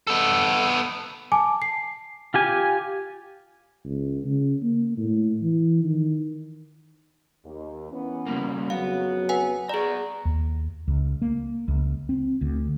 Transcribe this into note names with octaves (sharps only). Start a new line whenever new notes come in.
B3 A4
G#5 A5 D6
C7
F4 G4 G#5
C#2
C#3
A#3
A2
E3
D#3
D#2
E3 B3 C#4
C#3 G3 A#3
F2 C#3 F#3 B3 F5
B4 F#5 G#5
B3 G#4 D5 A#5
D#2
C#2
A#3
C#2
C4
D2